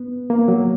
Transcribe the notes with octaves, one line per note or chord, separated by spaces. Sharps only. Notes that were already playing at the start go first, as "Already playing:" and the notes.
Already playing: B3
A#3
F#3